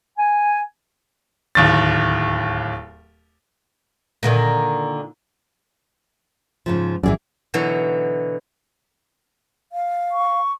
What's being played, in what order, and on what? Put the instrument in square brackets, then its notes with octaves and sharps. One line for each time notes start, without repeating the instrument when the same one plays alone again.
[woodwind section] G#5
[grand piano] D1 D#2 A6
[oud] A#2 D3 D#3
[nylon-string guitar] G#2 C#3 F3
[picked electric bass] G#1 F#2 [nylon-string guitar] E3 G#4 D5
[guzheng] B2 D3 E3 F#3 E4
[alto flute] F5
[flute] C#6